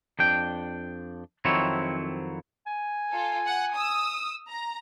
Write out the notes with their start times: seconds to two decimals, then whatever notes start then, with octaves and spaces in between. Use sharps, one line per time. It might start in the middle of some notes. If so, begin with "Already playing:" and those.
0.19 F2 D4 G5
1.45 F2 D#3 F#3 C4 E4 C#5
2.67 G#5
3.11 F4 A4
3.47 F#5
3.76 D#6 E6
4.50 A#5